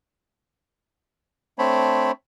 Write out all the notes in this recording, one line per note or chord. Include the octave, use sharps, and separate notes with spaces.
A3 C4 D4 C5 C#5 B5